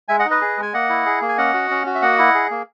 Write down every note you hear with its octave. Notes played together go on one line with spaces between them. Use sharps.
G#3 E5 G#5
D#5 F#5
D#4
B4 D#5
G#4
G#3
G#5
A#3 D#5 F#5
E4
G#4
A#3
G#5
C#4 D#5 F#5
F#4
C#4
F#4
E5
A#3 D#5 F#5
E4
G#4
A#3